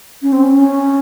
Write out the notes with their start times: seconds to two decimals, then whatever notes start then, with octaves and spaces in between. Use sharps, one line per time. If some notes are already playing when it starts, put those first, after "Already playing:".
0.22 C#4
0.32 C4
0.43 C#4
0.54 C#4